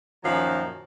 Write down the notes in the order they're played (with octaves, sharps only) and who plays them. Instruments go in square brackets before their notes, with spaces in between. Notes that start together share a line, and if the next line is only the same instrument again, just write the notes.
[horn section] F#2 A#2 D#3 F3 F#3